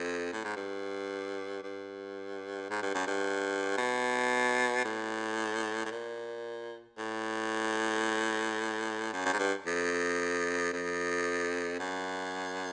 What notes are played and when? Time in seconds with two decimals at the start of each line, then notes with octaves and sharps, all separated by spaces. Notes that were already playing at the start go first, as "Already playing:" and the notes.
Already playing: F2
0.33 A2
0.44 G#2
0.56 G2
1.63 G2
2.70 G#2
2.82 G2
2.95 F#2
3.07 G2
3.78 B2
4.85 A2
5.85 A2
5.91 A#2
6.98 A2
9.13 F#2
9.26 F#2
9.33 G#2
9.39 G2
9.66 F2
10.73 F2
11.79 F#2